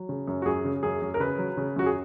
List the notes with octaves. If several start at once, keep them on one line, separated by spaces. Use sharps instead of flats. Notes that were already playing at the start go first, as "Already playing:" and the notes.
Already playing: F#3
C#3
F#2
F#4
F#2 G#4
C#3
F#2 G#4
F#2
A#4
C#3 B4
F#3
C#3
F#2 F#4
G#4